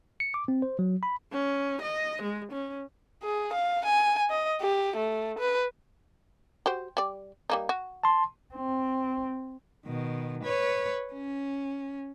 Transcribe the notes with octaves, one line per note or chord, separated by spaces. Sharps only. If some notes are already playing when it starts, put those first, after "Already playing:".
C#7
D6
C4
C5
F#3
B5
C#4
D#5
G#3
C#4
G#4
F5
G#5
D#5
G4
A3
B4
F#4 G4 C5
G3 D5
G3 A#3 D#4
F#4
A5 C6
C4
B2 D#3
B4 C#5
C#4